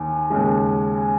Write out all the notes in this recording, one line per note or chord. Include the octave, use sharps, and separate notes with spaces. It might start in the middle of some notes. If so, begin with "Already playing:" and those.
Already playing: D#2 D#3 G#5
D#2 C#3 G#3
G#5